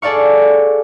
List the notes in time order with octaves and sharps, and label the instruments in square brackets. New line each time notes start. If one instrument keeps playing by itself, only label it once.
[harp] G#4 A4 D5 F5 C#6